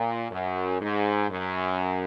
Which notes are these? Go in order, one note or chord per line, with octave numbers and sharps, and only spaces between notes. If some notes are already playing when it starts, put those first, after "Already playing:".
Already playing: A#2
F#2
G#2
F#2